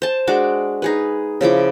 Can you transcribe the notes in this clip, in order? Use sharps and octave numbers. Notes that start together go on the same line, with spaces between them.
C5 A5
G#3 D4 F#4 D6
D#4 G#4 B4
C#3 F3 E4 D6